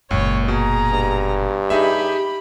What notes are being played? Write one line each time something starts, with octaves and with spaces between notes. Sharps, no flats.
F#1 C#2 A#2 C#5
B2 G#4 A#5
G2
C#4 D#4 G4 G#4 E5 B5